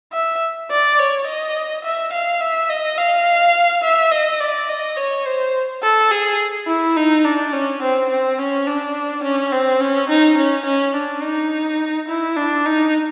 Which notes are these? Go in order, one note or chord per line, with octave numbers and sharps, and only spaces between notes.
E5
D5
C#5
D#5
E5
F5
E5
D#5
F5
E5
D#5
D5
D#5
C#5
C5
A4
G#4
E4
D#4
D4
C#4
C4
C4
C#4
D4
C#4
C4
C#4
D#4
C#4
C#4
D4
D#4
E4
D4
D#4